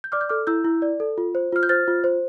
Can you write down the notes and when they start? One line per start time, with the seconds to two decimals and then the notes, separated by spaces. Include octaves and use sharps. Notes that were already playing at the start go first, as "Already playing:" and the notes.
0.04 G6
0.12 D5 D6 F6
0.21 G6
0.29 A4 D6 F6
0.47 E4 E6 G6
0.65 E4
0.82 D5
1.00 A4
1.18 F4
1.35 C5
1.52 F4 F6
1.63 G6
1.69 C5 F6 A6
1.88 F4
2.04 C5